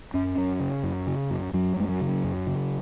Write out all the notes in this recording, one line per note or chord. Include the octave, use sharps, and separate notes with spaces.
F#2 C#4
F#2
C#3
F#2
C#3
F#2
F#2 F#3
F#2 G#3
F#3
C#3
F#2
C#3